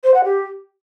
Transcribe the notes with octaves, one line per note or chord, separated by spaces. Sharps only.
C5
F#5
G4